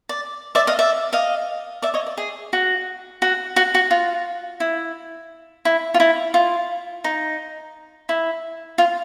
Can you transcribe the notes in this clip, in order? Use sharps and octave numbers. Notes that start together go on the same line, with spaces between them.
D5
D5 E5
D#5 F5
D5 E5
D#5 F5
D5 E5
C#5 D#5
D5
G#4
F#4
F#4
F#4
F#4
F4
E4
E4
F4
E4
F4
D#4
E4
F4